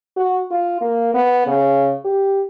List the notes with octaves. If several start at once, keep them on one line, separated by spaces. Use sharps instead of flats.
F#4
F4
A#3
B3
C#3
G4